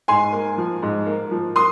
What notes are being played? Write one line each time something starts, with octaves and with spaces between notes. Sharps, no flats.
G#2 G#5 C6
A#3
F3
G#2
A#3
F3
A#3 C6 D#6